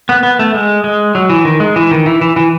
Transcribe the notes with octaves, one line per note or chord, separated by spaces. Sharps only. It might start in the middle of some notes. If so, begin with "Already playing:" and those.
B3
B3
A3
G#3
G#3
F#3
E3
D#3
G#3
E3
D#3
E3
E3
E3